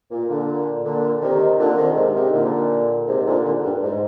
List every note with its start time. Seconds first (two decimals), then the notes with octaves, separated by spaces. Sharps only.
0.11 A#2
0.29 A#2 D3
0.85 A#2 D3
1.22 C3 D#3
1.60 A#2 D3
1.78 C3 D#3
1.96 G#2 C3
2.15 C3 D#3
2.33 A#2 D3
3.08 G#2 C3
3.26 A#2 D3
3.44 A#2 D3
3.63 G2
3.82 G#2